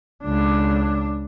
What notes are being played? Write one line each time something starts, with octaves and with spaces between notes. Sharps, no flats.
C#2 D4